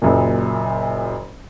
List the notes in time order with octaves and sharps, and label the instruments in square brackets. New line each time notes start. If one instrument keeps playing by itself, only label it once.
[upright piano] F#1 F#2 A#2